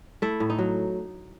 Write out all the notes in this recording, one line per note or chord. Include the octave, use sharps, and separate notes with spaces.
A3 E4
A2
D#4
F#3